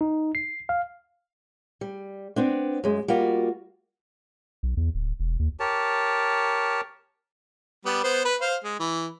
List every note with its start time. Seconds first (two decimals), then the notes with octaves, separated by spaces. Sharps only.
0.01 D#4
0.35 C7
0.69 F5
1.81 G3
2.36 B3 C4 D4
2.84 F#2 G#3
3.08 G3 A#3 F4 F#4
4.63 B1
4.77 E2
4.95 D1
5.20 E1
5.39 D#2
5.60 G4 A#4 C#5 A5
7.85 G3 B3
8.04 B3 C5
8.25 B4
8.41 C5 F5
8.64 G#3
8.80 E3